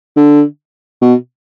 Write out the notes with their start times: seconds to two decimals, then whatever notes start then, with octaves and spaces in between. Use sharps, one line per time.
0.16 D3
1.01 B2